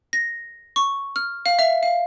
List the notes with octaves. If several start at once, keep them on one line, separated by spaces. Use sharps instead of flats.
A#6
C#6
F6
F5
E5
F5